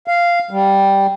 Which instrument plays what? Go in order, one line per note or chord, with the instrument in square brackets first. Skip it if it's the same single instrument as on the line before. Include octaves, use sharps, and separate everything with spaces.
[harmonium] F5
G3